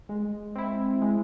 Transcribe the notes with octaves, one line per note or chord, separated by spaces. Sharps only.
G#3
C4 E4
G#3